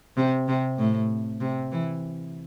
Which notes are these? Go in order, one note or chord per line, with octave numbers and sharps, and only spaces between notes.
C3
C3
A2
C3
E3